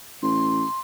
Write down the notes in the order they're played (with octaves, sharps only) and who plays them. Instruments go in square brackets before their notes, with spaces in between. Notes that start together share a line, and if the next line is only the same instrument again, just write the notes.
[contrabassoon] A1 [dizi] C6